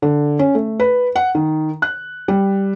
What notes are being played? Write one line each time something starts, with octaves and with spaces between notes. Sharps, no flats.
D3
C#4
A3
B4
F#5
D#3
F#6
G3